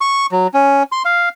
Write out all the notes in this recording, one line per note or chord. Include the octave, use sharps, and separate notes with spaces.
C#6
F#3
C#4
C6
F5